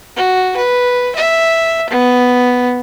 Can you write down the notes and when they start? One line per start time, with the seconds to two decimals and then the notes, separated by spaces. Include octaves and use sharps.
0.17 F#4
0.57 B4
1.15 E5
1.90 B3